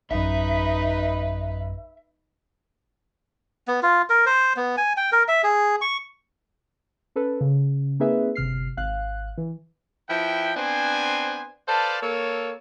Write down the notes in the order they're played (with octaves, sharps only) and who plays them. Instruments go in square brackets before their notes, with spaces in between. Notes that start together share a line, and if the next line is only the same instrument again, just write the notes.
[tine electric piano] A1 F#2 [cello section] D#4 B4 [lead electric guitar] E5
[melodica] B3
F4
A#4
C5
B3
G#5
G5
A#4
E5
G#4
C#6
[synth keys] C#4 A4 B4
C#3
A#3 C4 D#4 G#4 B4 E5
G1 C3 F6 C7
G#1 F5 F#6
E3
[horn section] F3 E4 B4 G5
B3 C4 D4 C5 G#5
A4 B4 C5 D5 F5 A5
A#3 A4 C#5